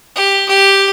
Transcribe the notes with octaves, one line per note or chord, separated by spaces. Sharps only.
G4
G4